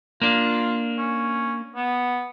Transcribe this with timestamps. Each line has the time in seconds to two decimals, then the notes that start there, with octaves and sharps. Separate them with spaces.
0.22 A#3 D4 F4
0.98 C#4
1.76 B3